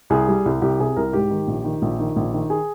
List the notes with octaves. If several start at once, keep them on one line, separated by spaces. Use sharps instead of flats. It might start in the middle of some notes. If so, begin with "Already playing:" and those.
C2 G#4
G3
C2
C2 G4
C3 G#4
C2 A#4
G#2 G4
D#3
A#1
D#3
A#1
D#3
A#1
D#3
G#4